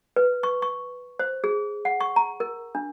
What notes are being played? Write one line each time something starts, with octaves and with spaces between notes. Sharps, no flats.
B4
C#6
C#6
C5
G#4
F#5
C#6
A#5
A#4
D4